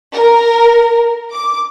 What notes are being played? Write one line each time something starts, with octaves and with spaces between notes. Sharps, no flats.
A#4
D6